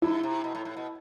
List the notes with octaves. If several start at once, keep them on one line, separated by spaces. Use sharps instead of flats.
G2 E4
C3
B2
A2
A2
B2